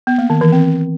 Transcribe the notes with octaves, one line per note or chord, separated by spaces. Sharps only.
B3
A#3
D#3
E3
C4